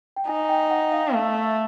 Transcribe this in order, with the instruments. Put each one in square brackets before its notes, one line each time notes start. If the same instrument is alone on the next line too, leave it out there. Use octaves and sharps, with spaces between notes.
[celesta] G5
[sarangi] D#4 [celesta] G#5
[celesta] G5
F#5
F5
[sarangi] A3 [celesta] F5
[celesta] E5